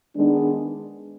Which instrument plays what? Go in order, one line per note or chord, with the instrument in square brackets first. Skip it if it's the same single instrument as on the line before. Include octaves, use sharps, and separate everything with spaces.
[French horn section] D#3 G#3 B3 D4